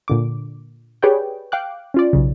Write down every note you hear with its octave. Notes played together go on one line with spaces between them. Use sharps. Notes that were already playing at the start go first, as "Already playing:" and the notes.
A#2 D3 D6
G4 G#4 B4 C#5 D5 G5
F5 G5 D6 F#6
C#4 F4 D5
B1 C#3